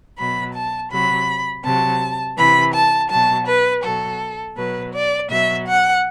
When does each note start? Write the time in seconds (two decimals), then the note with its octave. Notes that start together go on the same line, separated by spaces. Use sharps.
0.18 B2 F#3 B5
0.54 A5
0.91 C3 F#3 B5
1.64 C3 F#3 A5
2.37 C3 E3 B5
2.73 A5
3.10 B2 F#3 A5
3.46 B4
3.83 B2 F#3 A4
4.56 B2 F#3 B4
4.93 D5
5.29 B2 F#3 E5
5.66 F#5